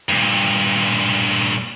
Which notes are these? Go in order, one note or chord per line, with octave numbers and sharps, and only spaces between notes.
G2 A#2